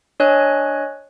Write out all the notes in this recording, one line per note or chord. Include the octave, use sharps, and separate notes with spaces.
D4 C#5 D#5 G#5 F#6